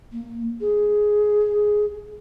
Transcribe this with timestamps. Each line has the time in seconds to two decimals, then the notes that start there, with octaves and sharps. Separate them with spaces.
0.12 A#3
0.61 G#4